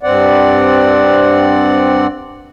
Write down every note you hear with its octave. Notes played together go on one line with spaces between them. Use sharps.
G2 C4 D5 F#5